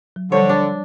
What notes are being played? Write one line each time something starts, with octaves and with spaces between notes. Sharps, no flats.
F#3
D3 F3 G3 C5 C#5
D4